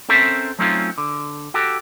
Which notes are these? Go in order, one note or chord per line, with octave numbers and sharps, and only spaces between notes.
C4 C#4 A4 A#4 C5 E5
F#3 A3 C4 C#4 D#4 F4
D3
F#4 G4 A4